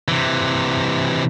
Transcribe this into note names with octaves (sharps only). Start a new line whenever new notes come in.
C3 E3